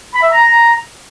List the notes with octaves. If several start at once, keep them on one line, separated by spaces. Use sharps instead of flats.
B5
E5
A#5